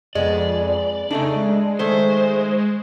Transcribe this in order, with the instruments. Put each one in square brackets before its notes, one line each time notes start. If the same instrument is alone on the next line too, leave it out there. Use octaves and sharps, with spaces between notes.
[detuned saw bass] F2 [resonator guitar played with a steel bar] G#3 B3 [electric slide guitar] D5
[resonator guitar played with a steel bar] C#3 A3 D4 [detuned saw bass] D#4
[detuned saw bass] G#3
[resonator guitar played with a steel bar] D#3 A3 G#4 [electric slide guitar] C5